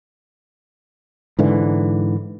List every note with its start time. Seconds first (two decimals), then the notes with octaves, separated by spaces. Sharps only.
1.39 G#2 D3 E3